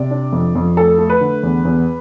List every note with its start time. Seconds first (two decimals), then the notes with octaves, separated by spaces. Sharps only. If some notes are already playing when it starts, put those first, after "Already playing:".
Already playing: C3 D5
0.11 D4
0.32 F2
0.55 F2
0.77 A3 A4
0.98 A3
1.10 B4
1.21 D3
1.43 E2
1.65 E2